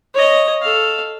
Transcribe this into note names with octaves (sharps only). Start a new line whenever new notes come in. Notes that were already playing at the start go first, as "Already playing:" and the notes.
C#5 D#5
A4 F5